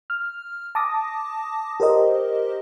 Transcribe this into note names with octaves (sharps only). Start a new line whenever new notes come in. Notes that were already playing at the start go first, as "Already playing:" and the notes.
F6
A5 D6 D#6 A#6
G4 A#4 C5 D#5